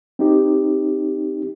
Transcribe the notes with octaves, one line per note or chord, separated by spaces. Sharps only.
C4 D#4 G4